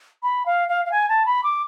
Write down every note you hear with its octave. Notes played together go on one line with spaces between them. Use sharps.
B5
F5
F5
F5
G#5
A5
B5
D6